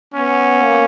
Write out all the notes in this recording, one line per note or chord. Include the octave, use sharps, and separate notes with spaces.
B3 C#4
A#3